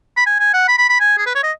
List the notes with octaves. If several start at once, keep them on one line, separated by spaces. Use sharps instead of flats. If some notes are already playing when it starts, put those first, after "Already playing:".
B5
G#5
G#5
F#5
B5
B5
B5
G#5
G#4
B4
C#5
D#5